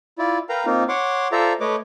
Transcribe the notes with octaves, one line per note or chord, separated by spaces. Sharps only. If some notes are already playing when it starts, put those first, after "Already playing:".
E4 F4 D5
A#4 B4 F5 G5 A#5
A#3 C4 D#4 F4 A#4
C#5 F#5 C6 D6
F4 A4 C5 D5 E5 A#5
A3 B4 C#5 D#5 D6